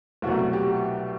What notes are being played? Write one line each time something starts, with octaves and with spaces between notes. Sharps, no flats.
C2 B2 F#3 A3 F#4
G4